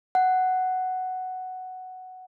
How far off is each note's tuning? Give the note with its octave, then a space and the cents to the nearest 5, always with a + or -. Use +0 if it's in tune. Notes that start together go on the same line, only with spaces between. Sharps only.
F#5 +5